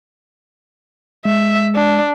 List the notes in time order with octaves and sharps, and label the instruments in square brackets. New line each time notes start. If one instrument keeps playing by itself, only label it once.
[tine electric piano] G#3 [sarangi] E5
[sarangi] D4